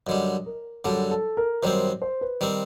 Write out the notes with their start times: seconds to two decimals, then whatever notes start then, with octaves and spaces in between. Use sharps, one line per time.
0.07 F#2 D3 G3 D#5
0.46 A#4
0.84 F#2 D3 G3 A4
1.11 A4
1.37 A#4
1.63 F#2 D#3 G3 C4 C5
2.02 C5
2.21 B4
2.41 D#3 G3 C4 C5